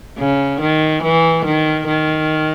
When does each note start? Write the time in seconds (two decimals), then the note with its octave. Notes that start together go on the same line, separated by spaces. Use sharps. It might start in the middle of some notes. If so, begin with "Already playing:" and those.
0.18 C#3
0.60 D#3
1.03 E3
1.45 D#3
1.87 D#3